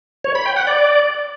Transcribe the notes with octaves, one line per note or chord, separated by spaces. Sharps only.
C#5
B5
G5
F#5
D5